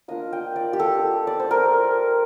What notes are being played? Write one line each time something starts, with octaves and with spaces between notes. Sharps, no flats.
A#3 D4 F4 D#5
G5
D5
G4
A4
D5
C5
A#4